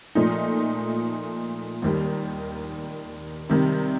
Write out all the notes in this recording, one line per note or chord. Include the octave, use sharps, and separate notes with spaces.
A#2 F3 A3 D#4
D#2 D#3 G3
C3 D#3 G3